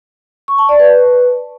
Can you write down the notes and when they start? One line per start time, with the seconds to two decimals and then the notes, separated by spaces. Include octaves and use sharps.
0.48 C#6
0.58 A5
0.69 D5
0.79 B4